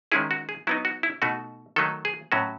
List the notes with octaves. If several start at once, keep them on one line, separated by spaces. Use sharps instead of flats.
D#3 G#3 C#4 E4 G#4
F#4
G#4
F#3 B3 D#4 E4
F#4
E4
B2 A3 D#4 F#4
D#3 F#3 A3 D#4 A4
G#4
A2 F#3 C#4 F#4